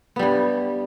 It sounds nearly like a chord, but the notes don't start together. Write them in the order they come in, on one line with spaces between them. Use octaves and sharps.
B3 G3 G2